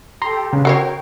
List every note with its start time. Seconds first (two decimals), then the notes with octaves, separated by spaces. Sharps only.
0.22 G4 A4 A#5 C6
0.53 C#3 B4
0.65 F#4 A#4 C#5 G5 C7